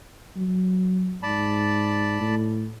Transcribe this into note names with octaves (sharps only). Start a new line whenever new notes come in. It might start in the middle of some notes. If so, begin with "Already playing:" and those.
F#3
G#2 D5 A5 B5
A2